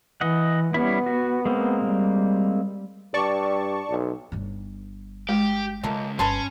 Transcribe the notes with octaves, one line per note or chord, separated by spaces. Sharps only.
E3 D#5 F#5
G3 B3 C#4 E4
F#4
G#3 A#3 C4
G3
G2 D5 A5 C#6
B1
G1 D4
G#3 G4
C#2 C#3 A3 A#3 F4
G1 C#4 B4 A5 C6